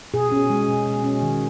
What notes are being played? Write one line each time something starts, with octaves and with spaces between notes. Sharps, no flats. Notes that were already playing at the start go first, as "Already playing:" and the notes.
B2 G#4
C#4
G#3
B2
B2
C#4
D#3